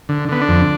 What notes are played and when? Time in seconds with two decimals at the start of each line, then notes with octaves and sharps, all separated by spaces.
0.09 D3
0.29 D3 B3
0.42 D4
0.48 F2